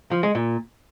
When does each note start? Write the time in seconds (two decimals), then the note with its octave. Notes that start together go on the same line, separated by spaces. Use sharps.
0.11 F3
0.23 G#3
0.35 A#2